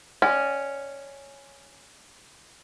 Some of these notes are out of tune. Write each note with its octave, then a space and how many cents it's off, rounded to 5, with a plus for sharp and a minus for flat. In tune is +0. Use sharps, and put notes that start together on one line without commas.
C#4 +0 D5 +20 F#5 +45